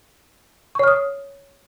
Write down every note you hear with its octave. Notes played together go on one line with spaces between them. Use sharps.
C#5 C#6 D#6 F6